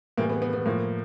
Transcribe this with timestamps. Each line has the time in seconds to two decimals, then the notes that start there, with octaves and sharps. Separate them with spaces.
0.17 A2 E3 G3 A#3
0.29 B3
0.42 B3
0.53 B3
0.66 A2 F3 A#3